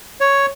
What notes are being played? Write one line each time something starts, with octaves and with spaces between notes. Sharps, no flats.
C#5